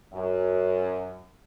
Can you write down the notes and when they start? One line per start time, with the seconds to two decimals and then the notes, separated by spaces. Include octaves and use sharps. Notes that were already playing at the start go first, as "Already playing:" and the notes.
0.13 F#2